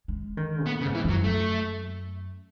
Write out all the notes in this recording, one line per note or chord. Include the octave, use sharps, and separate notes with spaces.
G#3
D#3
A2 B3
C#3
G#2
E3
F#2
F#3
A3